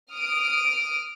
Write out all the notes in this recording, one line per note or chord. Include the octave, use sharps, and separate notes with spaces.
D#6 F6 D7